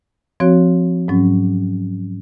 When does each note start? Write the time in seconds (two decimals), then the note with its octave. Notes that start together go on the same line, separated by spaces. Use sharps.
0.40 F3 C4 F#4 C#5
1.08 G#2 F#3 C#4